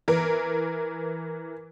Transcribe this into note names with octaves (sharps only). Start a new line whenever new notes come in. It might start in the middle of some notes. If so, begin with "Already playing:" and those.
E3 A#4